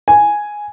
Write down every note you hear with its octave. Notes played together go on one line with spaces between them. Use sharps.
G#5